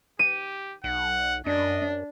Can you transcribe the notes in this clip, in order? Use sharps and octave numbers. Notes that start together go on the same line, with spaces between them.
G4 D#7
B1 F#5
F#2 D4 D#5